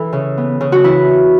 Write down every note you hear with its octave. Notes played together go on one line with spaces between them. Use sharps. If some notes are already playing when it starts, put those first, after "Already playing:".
Already playing: E3 A4
C#3
B3
C#3
F#4
E3 E4